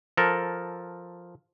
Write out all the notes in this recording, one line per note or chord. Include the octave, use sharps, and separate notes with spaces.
F3 A4 A#4